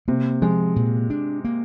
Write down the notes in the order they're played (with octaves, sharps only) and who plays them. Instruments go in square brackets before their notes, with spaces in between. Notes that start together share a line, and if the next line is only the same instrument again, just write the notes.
[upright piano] C3 [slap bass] A#3
[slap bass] F3 [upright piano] G#3
[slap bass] A#2
D4
A#3